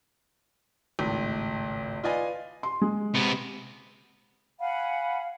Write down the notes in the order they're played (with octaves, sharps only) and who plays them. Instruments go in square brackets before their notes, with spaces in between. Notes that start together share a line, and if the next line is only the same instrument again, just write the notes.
[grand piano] G#1 C#2 A2
F4 B4 D5 D#5 F5 G#5
[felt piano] C6
G#3
[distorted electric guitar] C3 B3
[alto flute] F5 [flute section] F#5 G#5 B5